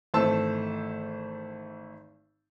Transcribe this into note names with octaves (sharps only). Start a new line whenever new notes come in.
G#1 E3 A3 C5 A5 E6